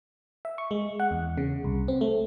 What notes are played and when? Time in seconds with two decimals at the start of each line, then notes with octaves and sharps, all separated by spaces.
0.45 E5
0.58 C#6
0.71 G#3
1.00 F#5
1.11 E2
1.38 C#3
1.64 C2
1.88 C4
2.01 A3